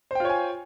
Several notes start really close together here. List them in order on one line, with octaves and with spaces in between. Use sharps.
C5 G5 F4 C#5 G#5